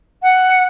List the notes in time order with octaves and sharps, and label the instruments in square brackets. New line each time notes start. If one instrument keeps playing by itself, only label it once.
[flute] F#5